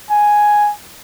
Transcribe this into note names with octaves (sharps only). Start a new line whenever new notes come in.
G#5